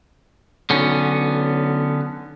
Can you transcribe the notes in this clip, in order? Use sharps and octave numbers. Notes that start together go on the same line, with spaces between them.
B1 D3 B3 C#4